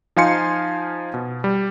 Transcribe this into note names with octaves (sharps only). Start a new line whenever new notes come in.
F3 D#4 F5 G#5 C6 C#7
B2
G3